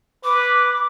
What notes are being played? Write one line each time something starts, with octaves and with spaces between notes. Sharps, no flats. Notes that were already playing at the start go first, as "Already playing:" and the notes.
B4 D6